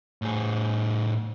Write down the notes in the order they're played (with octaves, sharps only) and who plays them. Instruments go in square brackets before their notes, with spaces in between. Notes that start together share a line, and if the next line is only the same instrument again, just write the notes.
[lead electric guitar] A2 G#4